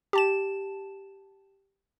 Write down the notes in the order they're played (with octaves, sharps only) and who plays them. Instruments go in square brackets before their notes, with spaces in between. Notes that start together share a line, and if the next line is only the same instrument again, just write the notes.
[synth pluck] G4 A5 E7